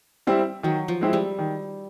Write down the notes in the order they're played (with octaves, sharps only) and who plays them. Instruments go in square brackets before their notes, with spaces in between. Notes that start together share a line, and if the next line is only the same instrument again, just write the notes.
[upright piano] G3 C4 E4
[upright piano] D#3 [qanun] F#3
[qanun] F3
[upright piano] G#3 C4 E4
[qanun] G3
[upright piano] D#3